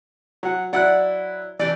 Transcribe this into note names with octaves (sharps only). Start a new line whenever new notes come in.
F#3 F#5
F#3 E4 D5 F#5 F#6
E3 D4 G4 D5